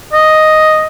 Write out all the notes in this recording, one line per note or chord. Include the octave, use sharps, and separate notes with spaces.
D#5